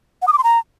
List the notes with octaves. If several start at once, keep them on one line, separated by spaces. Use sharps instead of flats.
F#5
D#6
D6
C6
A#5